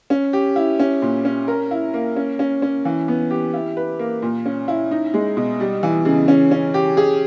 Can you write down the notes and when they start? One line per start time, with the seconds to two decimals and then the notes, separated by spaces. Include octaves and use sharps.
0.10 C#4
0.33 G4
0.56 E4
0.79 C#4
1.02 A#2
1.25 C#4
1.48 A#4
1.71 E4
1.94 A#3
2.16 C#4
2.39 C#4
2.62 C#4
2.85 E3
3.08 B3
3.31 G4
3.54 E4
3.77 B4
3.99 A#3
4.22 A#2
4.46 C#4
4.68 E4
4.91 D#4
5.14 G#3
5.37 B2
5.60 G3
5.83 E3
6.05 C#3
6.28 C#4
6.51 C#4
6.74 G4
6.97 G#4